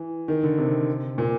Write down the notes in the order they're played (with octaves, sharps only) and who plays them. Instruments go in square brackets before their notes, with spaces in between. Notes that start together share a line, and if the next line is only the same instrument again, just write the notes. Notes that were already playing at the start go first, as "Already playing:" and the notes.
Already playing: [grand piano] E3
D#3
D3
C3
A#2